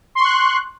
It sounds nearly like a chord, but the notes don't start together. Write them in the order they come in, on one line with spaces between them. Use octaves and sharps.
C6 C#6 F#6